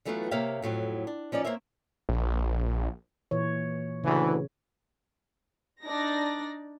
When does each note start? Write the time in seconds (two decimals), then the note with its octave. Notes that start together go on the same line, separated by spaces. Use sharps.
0.05 E3 F#3 A3 B3 D#4 F4
0.31 C3 A#3 C#5 E5 F5 G5
0.62 F2 A2 F#3 C4
1.07 D4
1.32 F3 C#4 D#4 D5
1.45 A#3 C4 C5 C#5 E5
2.09 A#1
3.31 A#2 E3 C#5
4.04 D2 C#3 E3
5.85 D4 D#4 D5 A#6